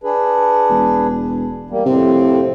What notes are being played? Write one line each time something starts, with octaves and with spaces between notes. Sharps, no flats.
D4 G#4 B4
E1
G3 A#3
F2 A2 C3 C4